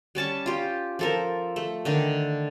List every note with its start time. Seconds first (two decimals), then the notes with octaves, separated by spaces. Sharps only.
0.15 G3 C#4 A5 C#6
0.46 F4 G4
0.99 F3 A4 A#4
1.56 A3
1.85 D3 D#3 D4